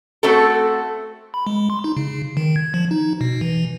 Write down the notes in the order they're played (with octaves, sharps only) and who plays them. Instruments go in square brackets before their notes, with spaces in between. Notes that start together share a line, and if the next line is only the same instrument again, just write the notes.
[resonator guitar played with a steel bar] A3 C4 F#4 A4
[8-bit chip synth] B5
G#3
C6
D#4
C#3
D#3
G#6
F3
D#4
B2
E3